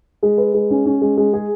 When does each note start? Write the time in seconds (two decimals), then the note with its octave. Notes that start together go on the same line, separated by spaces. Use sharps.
0.23 G#3
0.38 B4
0.54 G#3
0.71 C#4
0.86 C#4
1.01 G#3
1.17 G#3
1.33 G#4